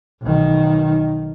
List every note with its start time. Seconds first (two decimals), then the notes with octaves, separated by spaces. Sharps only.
0.22 B1 D#3